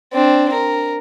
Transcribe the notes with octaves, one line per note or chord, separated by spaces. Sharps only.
C4 D4
A#4